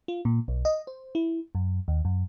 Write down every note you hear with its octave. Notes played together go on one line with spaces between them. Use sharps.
F4
A#2
B1
D#5
C5
E4
F#2
D#2
F#2